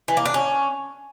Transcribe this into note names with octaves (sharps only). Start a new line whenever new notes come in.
E3
A#3
D4
C#4